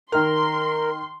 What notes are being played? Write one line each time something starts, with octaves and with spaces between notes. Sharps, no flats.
D#3 A#4 C6 F6